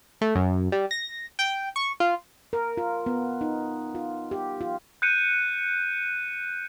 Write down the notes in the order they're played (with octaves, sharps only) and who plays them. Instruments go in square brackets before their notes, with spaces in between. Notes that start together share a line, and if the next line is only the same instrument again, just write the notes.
[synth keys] A3
F#2
G3
A#6
G5
C#6
F4
[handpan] A#4
F4
B3
D#4
F4
G4
F4
[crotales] F#6 G6 C#7 D#7